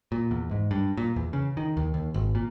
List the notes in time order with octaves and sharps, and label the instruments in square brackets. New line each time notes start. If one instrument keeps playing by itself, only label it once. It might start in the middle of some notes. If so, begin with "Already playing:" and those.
[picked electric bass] A#2
E2
G#2
G2
A#2
E2
C#3
D#3
D#2
D#2
G#1
A#2